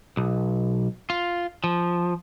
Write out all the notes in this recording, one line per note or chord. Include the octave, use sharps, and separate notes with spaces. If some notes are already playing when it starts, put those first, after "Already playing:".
B1
F4
F3